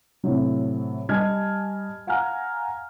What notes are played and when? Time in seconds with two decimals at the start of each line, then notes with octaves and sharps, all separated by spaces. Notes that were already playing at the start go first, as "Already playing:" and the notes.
0.24 A2 C3 F#3
1.09 G3 D#5 G#5 A5 F6 G#6
2.07 F5 F#5 G#5 A#5 F6